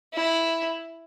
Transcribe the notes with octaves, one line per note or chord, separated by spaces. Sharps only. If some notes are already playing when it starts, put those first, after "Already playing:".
E4